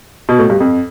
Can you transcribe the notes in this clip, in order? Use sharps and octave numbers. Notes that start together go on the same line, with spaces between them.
B2
A2
G2
F2